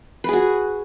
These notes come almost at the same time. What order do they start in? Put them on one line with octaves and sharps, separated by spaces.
B4 G#4 F#4